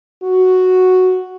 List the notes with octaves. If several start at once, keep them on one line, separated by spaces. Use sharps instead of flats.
F#4